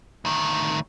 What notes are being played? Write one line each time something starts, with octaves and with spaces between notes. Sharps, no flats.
D2 D#3